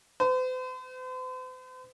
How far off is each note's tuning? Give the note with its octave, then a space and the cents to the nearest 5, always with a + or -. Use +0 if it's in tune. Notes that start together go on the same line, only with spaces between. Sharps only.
C5 -45